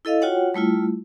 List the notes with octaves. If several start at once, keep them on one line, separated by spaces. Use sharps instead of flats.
E4 A4 D#5 F5
F4 F#4 C#5 F#5 G5
G3 A3 E4 F4